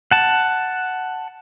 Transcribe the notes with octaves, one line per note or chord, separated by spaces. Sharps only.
F#5 A5